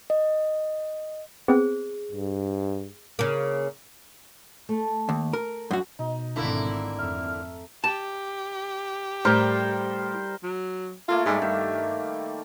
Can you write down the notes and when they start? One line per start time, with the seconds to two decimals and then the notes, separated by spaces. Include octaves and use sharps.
0.10 D#5
1.48 B3 C4 G#4 C5
2.11 G2
3.19 C#3 A#3
4.69 A3
5.09 D#2
5.33 A#4
5.71 F#2 F#4
5.99 B2 D#4
6.36 G#1 D3 A3 A#3 E4
6.98 F2 E5 F6
7.84 G4 A5
9.25 A2 G3 A#4 C5
10.43 F#3
11.08 A3 A#3 F4 A4
11.26 G#2 G3
11.42 G2 D#3 E5